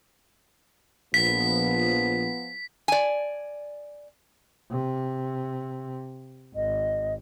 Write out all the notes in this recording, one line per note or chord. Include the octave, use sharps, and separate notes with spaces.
A#1 F3 B3 B6
D5 G#5
C3
G#1 D#5